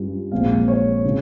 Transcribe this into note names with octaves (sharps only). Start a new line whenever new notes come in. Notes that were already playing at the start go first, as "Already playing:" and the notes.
Already playing: G2 G3 C#4 F4
A#1 A#2 G#3 C4 F5
C#5
C#3